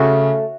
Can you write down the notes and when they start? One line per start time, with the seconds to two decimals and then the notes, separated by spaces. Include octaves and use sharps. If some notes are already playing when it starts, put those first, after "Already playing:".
Already playing: C#3 A3 C#4 F#4 A4